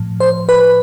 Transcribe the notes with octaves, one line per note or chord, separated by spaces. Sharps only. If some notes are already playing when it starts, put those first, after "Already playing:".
Already playing: A2 F3
C5
B4